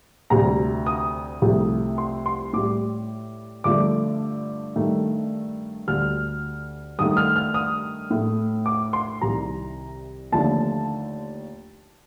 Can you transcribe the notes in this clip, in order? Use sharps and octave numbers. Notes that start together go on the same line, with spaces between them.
D2 C3 G3 A#5
D#6
C2 C3 F3 A3
C6
C6
A2 G3 D6
G2 D3 F3 A3 D6
G2 D#3 A3
D2 D3 G3 F6
G2 D#3 A3 D#6
F6
F6
D#6
A2 A3
D6
C6
C2 C3 D#3 G3 A#5
D#2 D3 F3 A3 A5